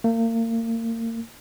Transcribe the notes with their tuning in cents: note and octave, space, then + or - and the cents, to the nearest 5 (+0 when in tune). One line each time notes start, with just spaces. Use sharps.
A#3 -35